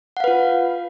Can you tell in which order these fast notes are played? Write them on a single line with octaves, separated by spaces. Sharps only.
F#5 F5 B4 F4